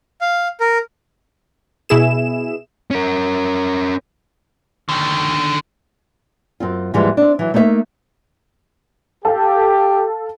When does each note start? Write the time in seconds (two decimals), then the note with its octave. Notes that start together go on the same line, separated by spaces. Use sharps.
0.21 F5
0.60 A#4
1.89 B2 E4 G#4 E7
2.91 C#4 A#4
4.89 D3 D#3
6.60 F#2 C4 F4
6.94 D#2 G#2 E3 F3 G3 G#3
7.17 C4 D4
7.39 E3 F#3
7.54 A3 A#3 D#4 C#5 E5
9.25 G4 A4 F5